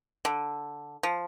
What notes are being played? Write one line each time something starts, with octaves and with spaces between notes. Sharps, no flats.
D3
F3